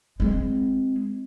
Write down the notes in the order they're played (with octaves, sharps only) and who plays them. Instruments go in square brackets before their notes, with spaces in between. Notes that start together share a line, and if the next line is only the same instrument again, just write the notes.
[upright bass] G#3 C4